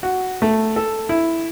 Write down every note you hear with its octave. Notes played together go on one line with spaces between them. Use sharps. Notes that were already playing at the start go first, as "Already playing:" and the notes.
F#4
A3
A4
E4